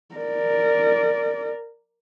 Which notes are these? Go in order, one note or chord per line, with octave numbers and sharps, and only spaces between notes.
A#4 D5